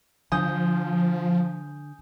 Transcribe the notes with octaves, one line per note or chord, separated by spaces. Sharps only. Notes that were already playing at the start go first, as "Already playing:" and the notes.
D3 F3 G#5 D#6 G6